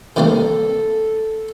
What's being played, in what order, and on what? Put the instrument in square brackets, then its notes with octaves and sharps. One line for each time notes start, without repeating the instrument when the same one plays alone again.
[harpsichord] C3 D#3 G3 A#3 [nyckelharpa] A4